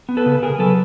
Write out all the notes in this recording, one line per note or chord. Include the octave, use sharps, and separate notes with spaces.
B3
A4 B4
C#3
C#3 G#4 A#4
F#3 A4 B4